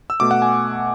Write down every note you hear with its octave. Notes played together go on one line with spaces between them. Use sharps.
E6
B2 A3 D6
F#5
G#5